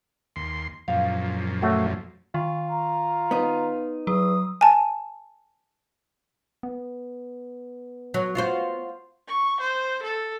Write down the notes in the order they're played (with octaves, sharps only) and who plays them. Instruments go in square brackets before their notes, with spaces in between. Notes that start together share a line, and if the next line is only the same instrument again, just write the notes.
[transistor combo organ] D#2 C6
[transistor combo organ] F#2 A#2 F3 [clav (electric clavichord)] F5
[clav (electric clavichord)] F#3 A3 F#4
[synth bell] D#3 [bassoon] F4
[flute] A#5
[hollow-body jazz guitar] B3 D#4
[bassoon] E2 [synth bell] F#3 [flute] D#6
[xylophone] G#5 A5
[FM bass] B3
[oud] F#3
F4 F#4 C5
[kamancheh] C#6
C5
A4